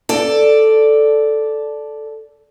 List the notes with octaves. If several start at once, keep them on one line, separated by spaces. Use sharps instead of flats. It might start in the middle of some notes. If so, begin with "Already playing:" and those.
A4 D5